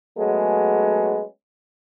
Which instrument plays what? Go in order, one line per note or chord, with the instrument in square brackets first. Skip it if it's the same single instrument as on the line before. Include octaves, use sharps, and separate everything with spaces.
[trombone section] F#3 G#3 A3 B3 C#4 G#4